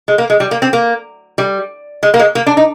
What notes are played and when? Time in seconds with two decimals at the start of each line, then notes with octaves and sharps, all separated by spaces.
0.08 G#3
0.18 A#3
0.30 G#3
0.40 G3
0.51 A#3
0.62 C4
0.73 A#3
1.38 G3
2.03 G#3
2.14 A#3
2.19 G#3
2.35 A#3
2.47 D4
2.57 D#4